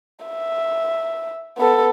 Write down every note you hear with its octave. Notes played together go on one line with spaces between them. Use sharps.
E5
B3 A4